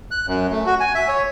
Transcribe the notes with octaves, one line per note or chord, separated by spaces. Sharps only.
F#6
F#2
A3
F#4
G#5
E5
C#5